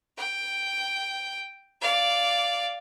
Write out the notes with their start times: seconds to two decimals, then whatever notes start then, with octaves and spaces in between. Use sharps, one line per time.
0.17 G5
1.81 D5 F5